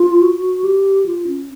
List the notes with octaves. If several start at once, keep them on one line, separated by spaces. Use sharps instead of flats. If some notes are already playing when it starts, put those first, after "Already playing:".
Already playing: F4
F#4
G4
F4
C#4